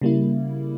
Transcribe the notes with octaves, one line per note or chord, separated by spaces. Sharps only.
C#3 G3 A#3 E4